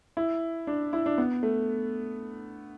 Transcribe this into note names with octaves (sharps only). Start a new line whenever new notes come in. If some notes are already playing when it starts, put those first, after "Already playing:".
E4
D4
E4
D4
B3
A3